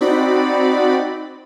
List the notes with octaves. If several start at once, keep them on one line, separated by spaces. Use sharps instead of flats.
C4 D#4 F#4 D5 B5